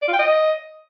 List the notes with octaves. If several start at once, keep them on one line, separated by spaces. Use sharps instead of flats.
D5
F4
G5
D#5